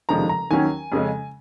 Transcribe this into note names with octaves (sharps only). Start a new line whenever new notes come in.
F1 D#2 C#3 F3 G#3 A#5
A#5
D#2 D#3 F#3 C#4 G#5
F2 C#3 G#3 C#4